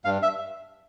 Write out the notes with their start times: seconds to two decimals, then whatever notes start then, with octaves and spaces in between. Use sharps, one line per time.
0.05 G2 F5
0.22 E5